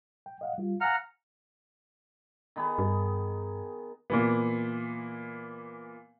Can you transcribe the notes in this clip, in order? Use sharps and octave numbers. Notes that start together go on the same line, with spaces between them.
G5
D#5 F5 F#5
G3 F4
F5 F#5 G#5 A#5 F6
D#3 B3 G#4
G2
A#2 E3 B3